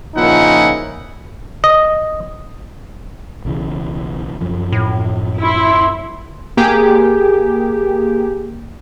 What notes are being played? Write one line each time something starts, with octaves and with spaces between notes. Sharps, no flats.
A#2 C#3 F3 D#4 E4 F#5
D#5
B1 C#3 E3
F#2 F3
A2
E4 C6
A#3 G4 G#4